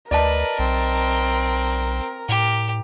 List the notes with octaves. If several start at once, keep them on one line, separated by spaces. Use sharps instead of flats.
D2 A#4 B4 D5 D#5 A5
B1 C4
A2 G4